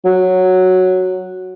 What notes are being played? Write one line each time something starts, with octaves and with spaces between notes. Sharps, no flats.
F#3